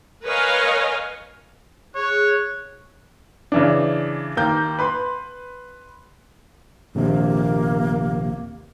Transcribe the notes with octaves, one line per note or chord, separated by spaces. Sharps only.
A#4 B4 C#5 D#5 F5 G#5
G#4 C#5 F#6
C#3 E3 D4
D#2 A#3 G6
B4 B5 C6
A#1 D#2 C3 A#3